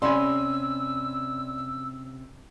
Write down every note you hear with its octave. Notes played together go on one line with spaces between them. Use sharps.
C3 C#4 D5 G#5 B5 C6 E6